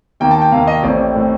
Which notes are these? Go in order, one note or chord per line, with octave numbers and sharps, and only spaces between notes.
D#2 D#3 A#3 G5
A5
G5
D#2 D#3 A#3 F5
D#5
A1 A2 A3 C4 D5
A2 A3 C4